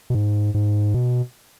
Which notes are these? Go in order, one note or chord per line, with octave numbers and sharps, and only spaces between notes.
B2
G#2
G#2
B2